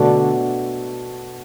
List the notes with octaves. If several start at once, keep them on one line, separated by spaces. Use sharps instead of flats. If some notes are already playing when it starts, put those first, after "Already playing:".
Already playing: B2 D3 A3 D4 F#4